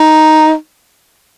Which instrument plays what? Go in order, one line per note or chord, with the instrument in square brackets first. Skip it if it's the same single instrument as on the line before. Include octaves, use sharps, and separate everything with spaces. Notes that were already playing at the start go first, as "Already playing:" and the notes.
Already playing: [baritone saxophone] D#4